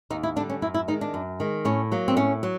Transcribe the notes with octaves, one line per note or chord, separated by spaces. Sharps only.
D#2 D#4
E4
D3 G3 D4
C#4
F#2 E4
E4
D#3 G#3 D#4
D4
F#2
D#3 G#3
A2 C#4
F#3 A#3
C4
A2 C#4
F#3